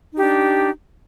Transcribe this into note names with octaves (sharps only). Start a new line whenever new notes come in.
D4 D#4 G4